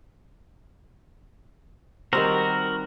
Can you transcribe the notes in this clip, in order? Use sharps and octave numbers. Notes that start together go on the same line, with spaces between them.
D#3 G3 C4 F#4 A#4